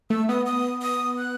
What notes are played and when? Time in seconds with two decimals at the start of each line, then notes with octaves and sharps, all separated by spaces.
0.10 A3 E6
0.29 B3 D#6
0.46 D#6
0.82 D#6
1.19 F#6